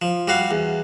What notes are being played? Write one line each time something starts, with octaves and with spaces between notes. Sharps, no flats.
F3
G3 F#4 F5
E2